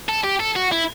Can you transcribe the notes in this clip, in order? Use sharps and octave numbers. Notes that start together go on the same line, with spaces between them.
A4
G4
A4
F#4
E4